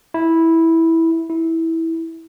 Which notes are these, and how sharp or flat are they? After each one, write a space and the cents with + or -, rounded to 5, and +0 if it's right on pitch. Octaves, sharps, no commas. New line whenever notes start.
E4 -10
E4 -15